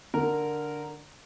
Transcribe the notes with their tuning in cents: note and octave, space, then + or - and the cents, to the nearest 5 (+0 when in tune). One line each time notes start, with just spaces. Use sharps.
D3 +0 A#4 -10